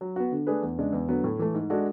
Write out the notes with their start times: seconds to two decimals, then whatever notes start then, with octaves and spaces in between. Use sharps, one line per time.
0.01 F#3
0.16 B3 F#4
0.32 D3
0.47 A3 D4 G#4 B4
0.63 E2
0.78 C#3 G#3 D4
0.93 E2
1.08 D3 F#3 B3
1.24 A2
1.39 E3 A3
1.54 G#2
1.70 G#3 D4 F#4 A4